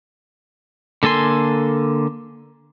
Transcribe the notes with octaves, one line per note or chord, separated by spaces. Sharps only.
D3 A#3 A4 G#5 C6